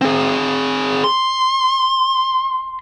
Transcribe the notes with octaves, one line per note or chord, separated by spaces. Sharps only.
C4 G#4
C6